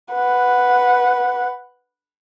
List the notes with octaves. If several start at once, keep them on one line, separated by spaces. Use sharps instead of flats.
B4 F#5